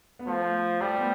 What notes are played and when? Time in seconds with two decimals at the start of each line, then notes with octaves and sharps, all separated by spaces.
0.19 B3
0.27 F3 A3
0.81 G3 A3
0.98 B3